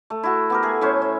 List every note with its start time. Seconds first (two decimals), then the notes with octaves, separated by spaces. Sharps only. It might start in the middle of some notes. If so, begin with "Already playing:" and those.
0.10 A3
0.23 E4 F#4
0.50 B3 G4 A#4
0.63 A3 G#4
0.81 A2 C#4 C5
1.02 C#5